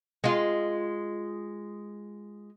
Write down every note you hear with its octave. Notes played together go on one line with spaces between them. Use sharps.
G#3 F4